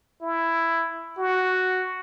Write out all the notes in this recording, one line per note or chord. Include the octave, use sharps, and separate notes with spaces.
E4
F#4